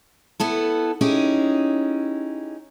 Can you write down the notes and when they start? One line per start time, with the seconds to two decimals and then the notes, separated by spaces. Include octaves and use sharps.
0.40 B3 E4 A4
1.01 C#4 D#4 E4 G4 G#4